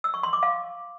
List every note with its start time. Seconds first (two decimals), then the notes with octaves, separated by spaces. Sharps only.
0.04 E6
0.14 C#6
0.23 C6
0.33 D6
0.43 F5